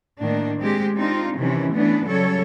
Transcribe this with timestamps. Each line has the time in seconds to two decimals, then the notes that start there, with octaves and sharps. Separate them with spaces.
0.21 A2 D#3 A#3 D4
0.59 G#3 C4 G4
0.95 C4 D4 D#4 F4
1.38 C3 D#3 E3 C#4
1.72 E3 A3 B3 C#4 D4
2.05 C#3 F#3 G3 A4 C#5